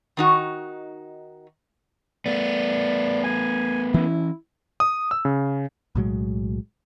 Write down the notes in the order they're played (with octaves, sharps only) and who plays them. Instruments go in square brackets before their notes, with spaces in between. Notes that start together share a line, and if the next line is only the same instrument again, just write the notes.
[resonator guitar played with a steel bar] D#3 D#4 F#4
[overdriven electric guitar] A3 B3 [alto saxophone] D5
[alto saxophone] G#5
[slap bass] E3 C#4 [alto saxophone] E4
[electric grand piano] D#6
E6
C#3
[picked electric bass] B1 A2 F#3 G#3